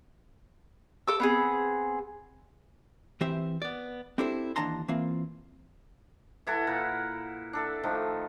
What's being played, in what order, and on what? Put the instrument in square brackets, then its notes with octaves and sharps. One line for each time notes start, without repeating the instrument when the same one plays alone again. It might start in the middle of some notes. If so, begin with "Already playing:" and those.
[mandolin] A4 D6 E6
B3 C4 G#4
[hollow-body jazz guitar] E3 C4 G4 C5 E5
B3 D5
C4 D4 E4 G4 A4 C5
D#2 E3 D4 A5 A#5 C6
E3 A#3 C4 F4
[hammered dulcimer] E3 E4 A4 F#5
A#2 A#4 B4
D4 A4 E5
D#3 F3 A3